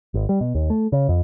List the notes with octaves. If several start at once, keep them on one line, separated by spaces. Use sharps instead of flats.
G#1
G3
B2
D#2
A3
C#3
F2